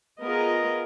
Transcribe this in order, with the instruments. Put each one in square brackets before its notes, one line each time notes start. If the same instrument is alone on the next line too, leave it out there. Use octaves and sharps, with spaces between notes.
[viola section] B3 F4 G#4 A#4 D#5